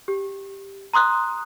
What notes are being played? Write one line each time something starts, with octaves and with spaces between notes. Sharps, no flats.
G4
A#5 C6 D#6 F#6